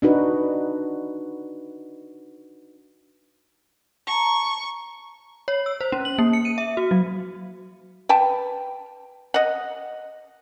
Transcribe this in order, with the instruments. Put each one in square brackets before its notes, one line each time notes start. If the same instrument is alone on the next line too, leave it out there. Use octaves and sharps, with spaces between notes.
[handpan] D4 D#4 F#4 B4
[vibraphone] A5 A#5 [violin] C#6
[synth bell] C#5
E6
C5
C#4
F#7
A#3
C#7
D#7
E5
F#4
F#3
[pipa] B4 G5 A5
D#5 F#5